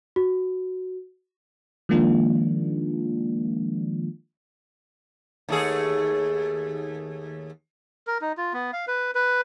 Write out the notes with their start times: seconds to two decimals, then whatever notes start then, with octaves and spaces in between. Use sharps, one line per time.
0.16 F#4
1.89 D#3 F3 G#3 A#3 D4 F4
5.49 D#2 A3 G#4
8.07 A#4
8.21 D#4
8.37 F4
8.53 B3
8.73 F5
8.88 B4
9.15 B4